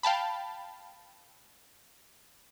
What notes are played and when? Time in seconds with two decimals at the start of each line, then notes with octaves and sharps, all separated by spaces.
0.03 F5 G5 A5 B5